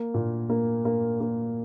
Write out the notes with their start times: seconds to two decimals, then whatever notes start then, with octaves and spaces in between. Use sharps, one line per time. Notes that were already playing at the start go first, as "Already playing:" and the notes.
Already playing: A#3
0.14 A#2
0.49 A#3
0.85 A#3
1.21 A#3